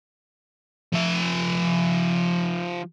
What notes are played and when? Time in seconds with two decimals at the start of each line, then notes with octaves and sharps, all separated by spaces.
0.93 F3 E5